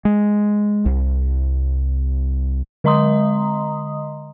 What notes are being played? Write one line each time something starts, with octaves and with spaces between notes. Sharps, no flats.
G#3
C2
D3 G#3 D#5 A#5 C6 D#6